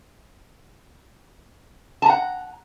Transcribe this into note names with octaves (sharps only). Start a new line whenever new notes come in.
F#5 A5 A#5